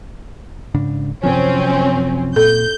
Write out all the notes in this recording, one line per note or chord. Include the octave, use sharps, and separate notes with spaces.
G#2 C#3 D4
F#2 C3 F3 C4 C#4
A#2 A4 G6